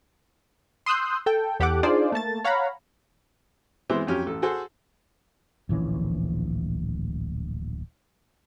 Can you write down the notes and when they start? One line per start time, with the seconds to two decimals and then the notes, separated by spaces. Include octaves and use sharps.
0.86 C6 D#6 E6 F#6 G6
1.26 A4 G5
1.60 E2 G4 A4 F#5 D6
1.83 D4 D#4 F4 G#4 C5 D5
2.12 A3 A#3 A5 A6
2.45 C#5 F5 F#5 A#5 B5
3.90 E3 G#3 B3 C4 C5 E5
4.07 F2 F#3 C#4 G4 F6
4.26 A1 A4
4.42 F#4 G#4 A4 C5
5.69 D1 A#1 E3 C#4